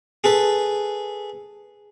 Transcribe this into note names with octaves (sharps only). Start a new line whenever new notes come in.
G#4 A4 B4